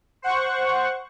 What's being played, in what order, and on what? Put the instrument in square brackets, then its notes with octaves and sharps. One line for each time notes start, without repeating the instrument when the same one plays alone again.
[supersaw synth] C5 F#5 C#6